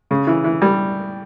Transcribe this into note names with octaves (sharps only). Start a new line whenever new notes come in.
C#3
E3
E3
G3